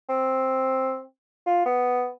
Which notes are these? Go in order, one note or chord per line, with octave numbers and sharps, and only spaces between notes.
C4
F4
B3